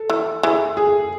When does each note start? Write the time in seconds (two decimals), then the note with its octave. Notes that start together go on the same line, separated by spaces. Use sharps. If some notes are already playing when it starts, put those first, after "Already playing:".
Already playing: A4
0.10 E3
0.43 E3 G#4
0.77 G#4